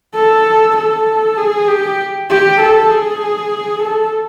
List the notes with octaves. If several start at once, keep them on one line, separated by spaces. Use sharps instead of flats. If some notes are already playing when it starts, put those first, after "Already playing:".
A4
A4
G#4
G4
G4
A4
G#4
A4